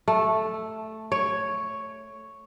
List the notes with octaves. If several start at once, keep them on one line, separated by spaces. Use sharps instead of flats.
A3
C#5